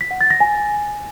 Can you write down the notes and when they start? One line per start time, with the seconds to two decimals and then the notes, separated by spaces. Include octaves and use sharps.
0.01 B6
0.11 F#5
0.21 A6
0.31 A#6
0.40 G#5